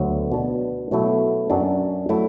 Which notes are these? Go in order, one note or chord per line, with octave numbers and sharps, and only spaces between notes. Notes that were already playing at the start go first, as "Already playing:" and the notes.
Already playing: D2 D3 F#3 B3
B2 B3 D4
B2 F#3 A3 E4
F#2 F#3 D4
F#3 A3 E4